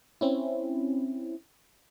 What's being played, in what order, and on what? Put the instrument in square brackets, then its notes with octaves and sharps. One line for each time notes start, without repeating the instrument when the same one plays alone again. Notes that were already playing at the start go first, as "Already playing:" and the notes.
[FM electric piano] C4 C#4 E4